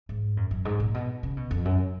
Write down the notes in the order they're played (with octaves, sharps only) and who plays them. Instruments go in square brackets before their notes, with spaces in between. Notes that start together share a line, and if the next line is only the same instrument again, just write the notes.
[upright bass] G#2
F#2
F#2
G#2
A#2
B2
C#3
B2
F2
F#2